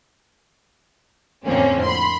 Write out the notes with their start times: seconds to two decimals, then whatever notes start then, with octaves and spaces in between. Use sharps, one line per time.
1.46 F2 A2 D3 A#3 C4 C#4
1.84 B5 C6